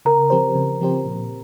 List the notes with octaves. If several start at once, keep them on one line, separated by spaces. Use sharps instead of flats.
C#3 A#4 A#5
F3 C4 G4 C5
C#3
F3 C4 G4 C5
A#2